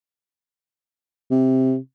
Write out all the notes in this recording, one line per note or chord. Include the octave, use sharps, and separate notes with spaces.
C3